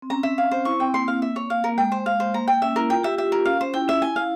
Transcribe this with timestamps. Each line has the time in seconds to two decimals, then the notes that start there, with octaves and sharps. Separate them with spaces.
0.02 C4
0.10 C#4 A#5
0.23 E5
0.38 F5
0.51 C5
0.65 E4 C#6
0.79 C4 G5
0.94 A#3 C6
1.08 F5
1.22 E5
1.36 C#5
1.50 A#3 F5
1.64 A#3 A#4
1.78 G#3 G5
1.92 C5
2.06 F5
2.20 C5
2.34 A#3 A#5
2.48 A#3 G5
2.62 C#4 E5
2.76 E4 A#4
2.90 F4 G5
3.03 G4 E5
3.18 G4 E5
3.32 F4 A#4
3.45 C#4 F5
3.61 C#4 C5
3.74 E4 G5
3.88 C#4 E5
4.02 E4 G#5
4.16 F5